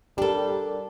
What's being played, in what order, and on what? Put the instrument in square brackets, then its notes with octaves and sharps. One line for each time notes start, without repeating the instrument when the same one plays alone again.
[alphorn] G3 [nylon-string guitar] D4 A4 [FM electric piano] G4 A#4